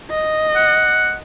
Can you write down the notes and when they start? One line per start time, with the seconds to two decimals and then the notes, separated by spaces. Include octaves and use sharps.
0.11 D#5
0.56 F#5